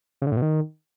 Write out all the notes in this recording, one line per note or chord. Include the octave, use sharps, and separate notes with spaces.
C#3
D3
A2
B2
D#3